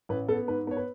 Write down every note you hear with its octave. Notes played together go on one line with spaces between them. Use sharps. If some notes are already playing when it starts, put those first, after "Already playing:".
A1 B4
B3 A4
G#2 B4
B3 C#5
B4